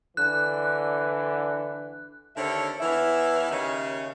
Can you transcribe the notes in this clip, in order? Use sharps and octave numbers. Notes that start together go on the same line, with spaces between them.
D3 E3 F#6
D#2 D3 C4 C#5 E5
E2 E3 C#5 E5
D#2 C#3 C#4 D#4 C#5 E5